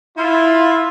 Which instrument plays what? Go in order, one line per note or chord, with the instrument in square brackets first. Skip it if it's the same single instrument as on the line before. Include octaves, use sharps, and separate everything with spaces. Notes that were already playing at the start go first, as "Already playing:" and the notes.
[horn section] E4 F4